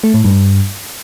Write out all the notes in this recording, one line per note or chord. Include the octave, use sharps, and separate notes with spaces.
A3
A2
G2